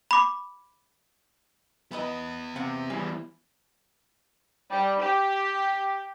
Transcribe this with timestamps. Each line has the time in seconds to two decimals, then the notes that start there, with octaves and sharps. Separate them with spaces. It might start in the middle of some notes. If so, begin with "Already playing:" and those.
0.11 B5 D6
1.92 D#3 B3 E4 B4 D#5
2.56 C3 F5 F#5
2.90 E3 G3 G#4
4.70 G3
5.01 G4